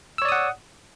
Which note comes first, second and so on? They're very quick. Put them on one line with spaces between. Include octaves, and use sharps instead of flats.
E6 C#5 D5 D#6 F#5